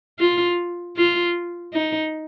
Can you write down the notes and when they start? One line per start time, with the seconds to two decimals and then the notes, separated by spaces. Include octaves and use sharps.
0.19 F4
0.97 F4
1.73 D#4